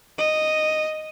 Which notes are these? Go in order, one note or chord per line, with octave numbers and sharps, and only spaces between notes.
D#5